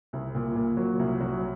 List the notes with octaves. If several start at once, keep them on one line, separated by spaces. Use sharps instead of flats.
C2
A#2
A#2
F#3
C2
F#3